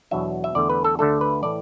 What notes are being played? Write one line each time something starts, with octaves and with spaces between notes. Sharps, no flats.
E2 B2 F#3 D4 E5
E5
E2 D3 A3 D5
B4
A4
D2 D3 A3 D4 A4
B4
A2 E3 A3 D5